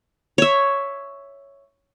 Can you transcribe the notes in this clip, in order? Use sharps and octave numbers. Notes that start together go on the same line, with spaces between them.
C#5 E5